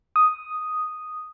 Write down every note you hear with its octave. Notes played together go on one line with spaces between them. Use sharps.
D#6